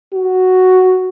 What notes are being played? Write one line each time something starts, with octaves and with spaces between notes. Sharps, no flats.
F#4